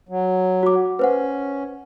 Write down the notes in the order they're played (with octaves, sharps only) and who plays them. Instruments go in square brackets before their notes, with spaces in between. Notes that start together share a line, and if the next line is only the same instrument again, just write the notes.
[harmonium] F#3
[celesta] F#4 D6
[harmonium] C#4 [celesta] B4 C5 F#5